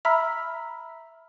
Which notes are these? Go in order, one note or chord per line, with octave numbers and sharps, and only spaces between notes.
E5 A#5 B5 E6 F6 B6